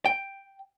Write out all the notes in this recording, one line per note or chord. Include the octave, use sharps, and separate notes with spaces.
G5